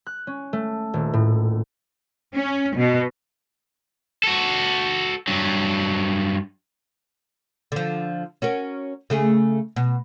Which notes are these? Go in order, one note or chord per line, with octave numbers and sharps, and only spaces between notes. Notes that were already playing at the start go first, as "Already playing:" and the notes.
F#6
C#4
A3
D#1
A2
C#4
B2
F#4 A4
G2 F#3
D3 F3
C#4 F#4 A#4
C#3 A3 G#4
B2